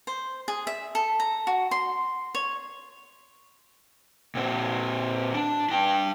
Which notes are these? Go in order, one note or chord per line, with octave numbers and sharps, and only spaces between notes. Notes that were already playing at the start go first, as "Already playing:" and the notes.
C5
G#4
E5
A4
A#5
F#4
C6
C#5
A#2 C4
D4
D4 G5